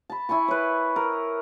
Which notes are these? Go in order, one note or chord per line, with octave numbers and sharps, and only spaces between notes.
A5 B5
E4 G#5 B5 C#6
B4 C#5
A#4